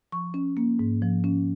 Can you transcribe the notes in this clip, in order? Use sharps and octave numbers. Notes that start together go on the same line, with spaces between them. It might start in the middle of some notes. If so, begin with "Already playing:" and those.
F3 C#6
C#4
A#3
G#2
F3
C#4